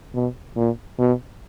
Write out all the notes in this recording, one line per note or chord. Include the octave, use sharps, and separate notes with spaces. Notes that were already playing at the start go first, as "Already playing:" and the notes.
B2
A#2
B2